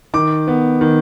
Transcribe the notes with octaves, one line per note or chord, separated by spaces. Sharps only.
D#3 D6
B3
D#3